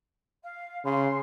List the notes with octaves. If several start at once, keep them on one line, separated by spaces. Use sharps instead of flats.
F5
C#3 C6